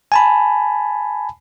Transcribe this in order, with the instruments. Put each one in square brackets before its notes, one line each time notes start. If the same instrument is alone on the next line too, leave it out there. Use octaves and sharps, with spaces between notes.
[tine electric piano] G#5 A5 B5